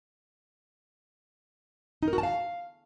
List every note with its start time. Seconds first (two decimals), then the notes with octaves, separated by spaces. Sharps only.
2.03 D#4
2.08 A#4
2.13 F#4
2.18 A5
2.23 F5